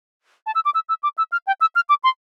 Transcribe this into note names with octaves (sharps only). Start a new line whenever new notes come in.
A5
E6
D6
E6
E6
D6
E6
F6
G5
E6
F6
D6
C6